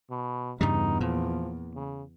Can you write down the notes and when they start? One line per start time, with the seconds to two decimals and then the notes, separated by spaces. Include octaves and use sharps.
0.10 B2
0.61 E2 G2 C#3 G3 D#4
1.01 A#2 F3
1.74 C#3